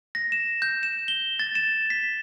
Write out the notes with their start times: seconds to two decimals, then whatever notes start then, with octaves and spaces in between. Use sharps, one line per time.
0.15 A#6
0.32 E7
0.62 G6
0.83 E7
1.08 G7
1.39 A6
1.55 E7
1.90 B6